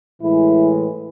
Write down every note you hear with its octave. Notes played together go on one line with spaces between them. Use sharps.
A2 E3 G#3 E4